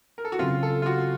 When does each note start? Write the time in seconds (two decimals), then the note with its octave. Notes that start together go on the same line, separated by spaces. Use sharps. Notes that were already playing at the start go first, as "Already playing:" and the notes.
0.18 A#4
0.25 A4
0.32 F#4
0.39 C#3 F#3 C4 F4
0.63 A4
0.82 F4
0.86 F#4